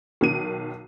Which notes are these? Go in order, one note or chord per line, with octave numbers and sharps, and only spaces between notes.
B1 D#3 D#7